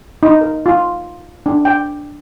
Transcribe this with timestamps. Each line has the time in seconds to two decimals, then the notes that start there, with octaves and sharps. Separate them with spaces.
0.23 D#4
0.41 A#4
0.66 F4
1.46 D4
1.65 G5